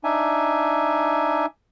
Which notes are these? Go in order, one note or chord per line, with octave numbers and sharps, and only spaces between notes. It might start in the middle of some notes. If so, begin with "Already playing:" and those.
D4 D#4 E5 G#5